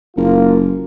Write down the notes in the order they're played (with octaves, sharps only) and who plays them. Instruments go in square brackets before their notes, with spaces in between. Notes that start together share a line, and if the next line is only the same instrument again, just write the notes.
[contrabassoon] F#1 [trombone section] A#3 F4